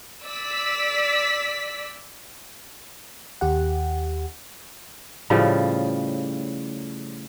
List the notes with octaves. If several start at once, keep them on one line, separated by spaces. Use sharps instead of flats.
D5 E6 B6
D#2 G4 F#5
A2 C#3 F3 G3